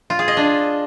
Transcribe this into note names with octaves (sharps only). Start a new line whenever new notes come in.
F4
G#4
D#5
D4